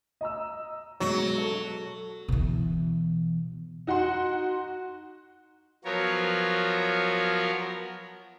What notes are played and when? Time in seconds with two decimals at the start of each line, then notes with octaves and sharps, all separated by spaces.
0.21 D#5 A#5 E6
1.00 B2 F#3 G#3
1.38 A4
2.28 B2 E3
3.87 D#4 F#4 F#5 C6
5.85 F3 F#3 B3 A#4 C#5